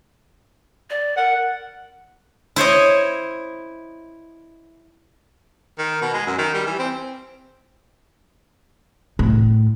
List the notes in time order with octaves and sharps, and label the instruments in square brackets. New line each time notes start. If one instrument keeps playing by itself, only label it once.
[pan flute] D5
[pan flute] A#4 [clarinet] F#5
[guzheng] E4 C5 C#5 D#5
[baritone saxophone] D#3
B2
G#3
F#2
D#3
G3
E3
C4
[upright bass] A2